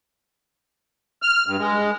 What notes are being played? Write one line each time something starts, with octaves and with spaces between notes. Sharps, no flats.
F6
G2
G#3